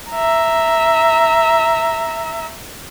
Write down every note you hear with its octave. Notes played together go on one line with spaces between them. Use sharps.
E5 A#5